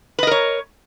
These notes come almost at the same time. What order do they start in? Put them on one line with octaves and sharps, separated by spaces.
B4 D#5 A#4 C#5